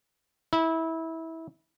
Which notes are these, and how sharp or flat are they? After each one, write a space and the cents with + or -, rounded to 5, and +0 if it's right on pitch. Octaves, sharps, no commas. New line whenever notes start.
E4 -20